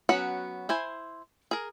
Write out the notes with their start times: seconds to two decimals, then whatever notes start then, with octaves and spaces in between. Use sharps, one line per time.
0.09 F#3 B3 C#4 F#4 F#5
0.69 E4 C5 G#5
1.51 G#4 A#4